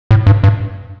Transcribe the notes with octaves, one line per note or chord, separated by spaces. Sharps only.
A2
G2
G2